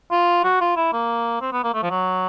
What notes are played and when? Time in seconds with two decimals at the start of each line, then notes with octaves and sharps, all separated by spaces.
0.11 F4
0.44 F#4
0.61 F4
0.76 E4
0.93 A#3
1.41 C4
1.52 B3
1.64 A#3
1.74 A3
1.83 F3
1.90 F#3